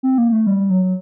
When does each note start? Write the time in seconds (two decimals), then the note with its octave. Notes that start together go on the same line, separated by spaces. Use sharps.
0.03 C4
0.18 A#3
0.32 A3
0.47 G3
0.70 F#3